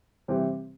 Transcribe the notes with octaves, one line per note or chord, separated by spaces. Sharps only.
C3 E3 G3 C4 G4